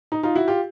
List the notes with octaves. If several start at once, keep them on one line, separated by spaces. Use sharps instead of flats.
D#4
D#4 F4
E4 F#4
F4 G4